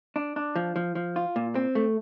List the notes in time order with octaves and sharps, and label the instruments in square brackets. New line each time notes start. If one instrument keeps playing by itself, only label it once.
[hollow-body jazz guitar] D4
D4
F3
F3
F3
F4
A#2
C4
A3